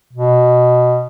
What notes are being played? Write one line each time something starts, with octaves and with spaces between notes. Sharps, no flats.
B2